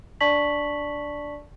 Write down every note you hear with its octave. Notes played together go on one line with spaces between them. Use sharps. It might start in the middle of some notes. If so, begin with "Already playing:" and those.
D4 D5 A5 C#6 B6 F#7